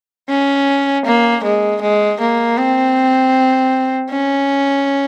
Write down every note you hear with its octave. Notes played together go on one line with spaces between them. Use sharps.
C#4
A#3
G#3
G#3
A#3
C4
C#4